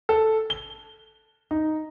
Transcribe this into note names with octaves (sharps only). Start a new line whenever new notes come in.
A4
G7
D#4